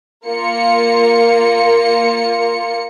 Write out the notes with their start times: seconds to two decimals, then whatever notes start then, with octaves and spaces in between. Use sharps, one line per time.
0.26 A#3 F4 C#7